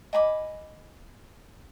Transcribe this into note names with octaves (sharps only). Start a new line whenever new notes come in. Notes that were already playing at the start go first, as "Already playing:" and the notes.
D#5 G#5 B5 D6